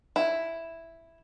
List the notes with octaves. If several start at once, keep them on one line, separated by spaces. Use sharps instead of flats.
E4